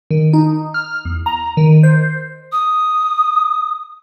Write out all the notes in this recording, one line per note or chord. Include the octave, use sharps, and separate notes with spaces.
D#3
D#4
F6
E2
A#5
D#3
C5
D#6